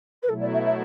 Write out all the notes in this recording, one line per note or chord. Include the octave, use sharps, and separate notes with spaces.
B4
B2 F#3 A3 E4 A4
D5
E5
E5